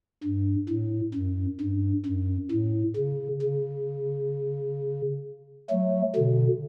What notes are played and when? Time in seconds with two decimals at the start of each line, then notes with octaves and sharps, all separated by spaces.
0.23 G2
0.69 A2
1.14 F#2
1.60 G2
2.06 F#2
2.51 A2
2.97 C#3
3.42 C#3
5.70 F#3 A3
6.15 B2 D3